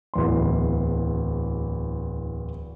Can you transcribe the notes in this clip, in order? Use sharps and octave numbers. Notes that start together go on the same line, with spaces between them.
D1 E2 C6